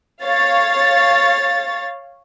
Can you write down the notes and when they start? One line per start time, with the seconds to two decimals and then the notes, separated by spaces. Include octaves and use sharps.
0.23 C#5 F5 A6